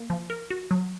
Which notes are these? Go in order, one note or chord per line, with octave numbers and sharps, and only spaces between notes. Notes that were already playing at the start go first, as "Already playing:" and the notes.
Already playing: A#3
F3
A#4
F#4
F#3